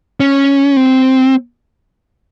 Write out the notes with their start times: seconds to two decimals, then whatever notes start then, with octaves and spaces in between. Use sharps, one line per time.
0.20 C#4
0.77 C4